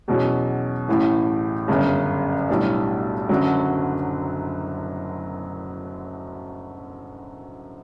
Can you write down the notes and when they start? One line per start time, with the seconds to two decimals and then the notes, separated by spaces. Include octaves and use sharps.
0.08 E2 B2 F#3 C#4
0.88 A1 A2 E3
1.68 G1 F#2 C#3
2.49 B1 A2 G3 D4
3.29 F#1 F#2 D3 F#3